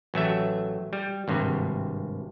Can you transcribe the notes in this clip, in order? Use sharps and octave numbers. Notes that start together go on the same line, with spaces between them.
A1 F#3 A3 E5
G3
G#1 G2 C3